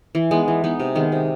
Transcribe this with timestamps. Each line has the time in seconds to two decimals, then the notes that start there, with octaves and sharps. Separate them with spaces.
0.15 E3
0.31 G#3 B3 D#4
0.48 E3
0.64 G#3 B3 D#4
0.80 C3
0.95 D#3 G#3 B3
1.12 C3